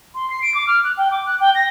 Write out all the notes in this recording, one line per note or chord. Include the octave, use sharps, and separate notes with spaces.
C6
C7
D7
D6
F6
F#6
G5
D6
F#6
G5
A#6